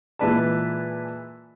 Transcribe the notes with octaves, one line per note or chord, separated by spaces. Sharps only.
A#2 E3 G#3 B4 D5 A5